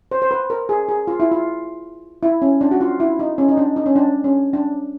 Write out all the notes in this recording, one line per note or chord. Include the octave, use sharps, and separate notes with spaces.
C5
C5
B4
A#4
G#4
G#4
F4
E4
F4
E4
C#4
D4
F#4
F4
E4
D#4
C#4
D#4
D4
D#4
C#4
D4
C#4
D4